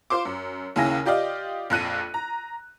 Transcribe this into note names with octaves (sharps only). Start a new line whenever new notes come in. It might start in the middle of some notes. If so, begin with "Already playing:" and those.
F4 C5 C6 D6
F#2
D#2 C#3 E4 G#5 A#6
F4 G4 D5 D#5 F5
A#1 F2 F#6 D#7
A#5